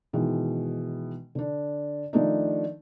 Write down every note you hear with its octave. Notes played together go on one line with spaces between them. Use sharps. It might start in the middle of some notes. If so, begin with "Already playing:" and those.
B2 D#3 E3 G#3
D3 D4
D#3 F3 A3 D4 D#4